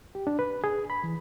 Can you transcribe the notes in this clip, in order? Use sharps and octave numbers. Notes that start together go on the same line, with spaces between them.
G4
D4
B4
G#4
B5
E3